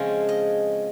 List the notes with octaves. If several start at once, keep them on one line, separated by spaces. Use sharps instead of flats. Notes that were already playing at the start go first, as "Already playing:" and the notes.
Already playing: C#3 F3 G#3 C4 E5
D#5